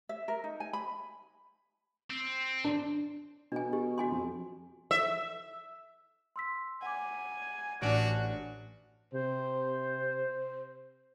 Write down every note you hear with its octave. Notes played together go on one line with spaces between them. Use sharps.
E5
A#4
D#4
G#5
B5
C4
D4
B2 D4 G#5
G4
F#4 G#5 C6
F2
E5
C6 E6 B6
F#5 G#5 D6
A1 D4 F#4 F6 D7
C3 C5